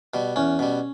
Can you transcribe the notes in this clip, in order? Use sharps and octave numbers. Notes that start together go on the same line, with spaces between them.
B2 G3
E2 C#4
B2 G3